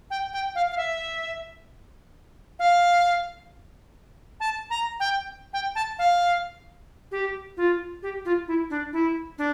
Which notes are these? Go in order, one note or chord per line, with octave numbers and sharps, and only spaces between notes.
G5
G5
F5
F5
E5
F5
A5
A#5
G5
G5
A5
F5
G4
F4
G4
F4
E4
D4
E4
D4